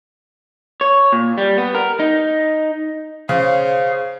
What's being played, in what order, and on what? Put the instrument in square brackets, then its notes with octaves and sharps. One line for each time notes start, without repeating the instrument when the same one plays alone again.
[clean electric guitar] C#5
A#2
G3
B3
A#4
D#4
[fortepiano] C#3 [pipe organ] G#4 F5 [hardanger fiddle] C5 C#5